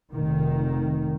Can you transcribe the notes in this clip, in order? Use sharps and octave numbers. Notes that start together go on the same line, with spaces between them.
F1 D#3